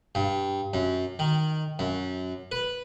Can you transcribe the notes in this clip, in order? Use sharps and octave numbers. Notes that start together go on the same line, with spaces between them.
G2
F#2
D#3
F#2
B4